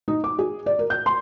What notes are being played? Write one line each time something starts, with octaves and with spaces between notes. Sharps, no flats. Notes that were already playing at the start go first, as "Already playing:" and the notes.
D#4
D6
G#4
D5
A#4
G6
C6